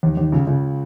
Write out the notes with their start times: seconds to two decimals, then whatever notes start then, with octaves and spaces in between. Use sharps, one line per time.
0.03 D#2 D#3
0.17 D#2 D#3
0.32 C#2 C#3
0.47 C#2 C#3